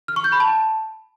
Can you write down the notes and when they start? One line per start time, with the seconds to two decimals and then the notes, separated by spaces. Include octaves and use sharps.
0.08 F6
0.16 C#6
0.24 G6
0.32 B5
0.40 A5